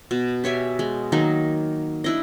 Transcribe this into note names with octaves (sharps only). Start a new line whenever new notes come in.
B2
G4 C#5 E5 G#5
G#3
D#3 F#3 A#3 D#4
D4 E4 D#5